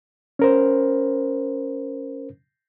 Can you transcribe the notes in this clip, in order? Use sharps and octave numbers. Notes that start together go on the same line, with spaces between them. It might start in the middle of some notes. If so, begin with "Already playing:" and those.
C#4 A#4 C5